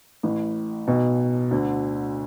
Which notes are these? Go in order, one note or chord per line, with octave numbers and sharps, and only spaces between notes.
A1 A2
B1 B2
D2 D3